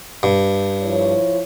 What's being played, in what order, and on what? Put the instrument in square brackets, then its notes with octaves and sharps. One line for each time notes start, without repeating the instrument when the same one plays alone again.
[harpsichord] G2
[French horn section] F3 E4 C#5